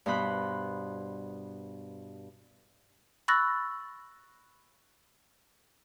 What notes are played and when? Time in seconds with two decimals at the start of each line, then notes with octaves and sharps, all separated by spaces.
0.06 G2 B2 B3 C5 B5 F#6
3.28 B5 C#6 E6 F#6 A6 A#6